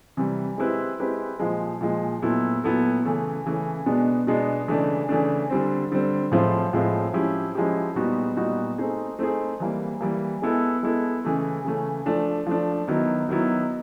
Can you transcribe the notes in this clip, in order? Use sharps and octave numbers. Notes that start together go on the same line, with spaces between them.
C3 E3 G3
G#3 C4 E4 G4 B4
G#3 C4 E4 G4 B4
A#2 F3 G#3
A#2 F3 G#3
A#2 F#3 B3 E4 A4
A#2 F#3 B3 E4 A4
C#3 E3 A3 C#4
C#3 E3 A3 C#4
B2 G#3 B3 D4
B2 G#3 B3 D4
C#3 E3 A3 D4
C#3 E3 A3 D4
D3 G3 C4
D3 G3 C4
A2 F3 G#3 C4 F4
A2 F3 G#3 C4 F4
F3 G#3 C#4 E4 G4
F3 G#3 C#4 E4 G4
A#2 G3 B3 D#4 F#4
A#2 G3 B3 D#4 F#4
A3 C4 D#4 G#4
A3 C4 D#4 G#4
E3 G3 A#3
E3 G3 A#3
G#3 B3 E4 A4
G#3 B3 E4 A4
C#3 E3 A3 C#4
C#3 E3 A3 C#4
F3 A3 D4
F3 A3 D4
D#3 F#3 B3 E4
D#3 F#3 B3 E4